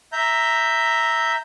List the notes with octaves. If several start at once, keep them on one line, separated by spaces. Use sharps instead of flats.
E5 A#5 G6